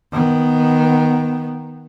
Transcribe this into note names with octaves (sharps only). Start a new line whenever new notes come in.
D#3 B3